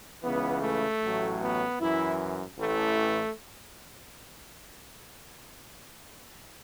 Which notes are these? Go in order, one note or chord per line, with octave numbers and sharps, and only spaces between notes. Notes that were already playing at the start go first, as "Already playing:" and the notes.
C#2 C#3 E3 B3
A3
A1 A2 F#3
B3
F#2 E3 E4
A1 A2 E3 A3